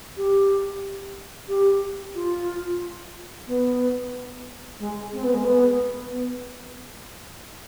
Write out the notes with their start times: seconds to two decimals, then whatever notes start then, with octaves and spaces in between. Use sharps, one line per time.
0.17 G4
1.49 G4
2.15 F4
3.47 B3
4.79 G#3
5.13 C4
5.23 B3
5.34 G#3
5.45 B3
6.12 B3